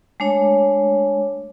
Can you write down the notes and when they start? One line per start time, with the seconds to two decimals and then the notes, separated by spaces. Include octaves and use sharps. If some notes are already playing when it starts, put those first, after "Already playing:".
0.20 G#3 A3 D4 C#5